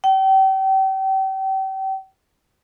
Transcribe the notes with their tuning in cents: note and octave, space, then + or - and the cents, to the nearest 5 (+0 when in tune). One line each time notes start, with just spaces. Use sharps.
G5 -35